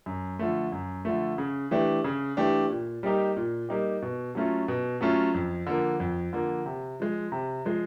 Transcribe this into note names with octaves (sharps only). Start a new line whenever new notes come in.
F#2
D3 F3 A3
F#2
D3 F3 A3
C#3
E3 A3 D4 G4
C#3
E3 A3 D4 G4
A#2
G3 A#3 D#4 G4
A#2
G3 A#3 D#4 G4
B2
F#3 A3 C#4 F4
B2
F#3 A3 C#4 F4
F2
D3 F3 A#3
F2
D3 F3 A#3
C3
F3 G#3
C3
F3 G#3